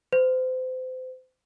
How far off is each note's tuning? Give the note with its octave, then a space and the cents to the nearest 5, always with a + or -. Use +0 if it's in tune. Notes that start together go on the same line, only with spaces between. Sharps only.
C5 -35